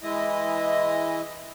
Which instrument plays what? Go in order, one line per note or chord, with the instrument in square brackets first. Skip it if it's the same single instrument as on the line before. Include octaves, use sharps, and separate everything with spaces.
[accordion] E3 G#3 E4 D#5